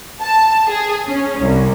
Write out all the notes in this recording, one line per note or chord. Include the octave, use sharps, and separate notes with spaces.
A5
G#4
C#4
C2